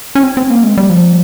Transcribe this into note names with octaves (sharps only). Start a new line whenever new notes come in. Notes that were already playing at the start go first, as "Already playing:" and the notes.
C#4
C4
C4
A#3
G#3
G3
F3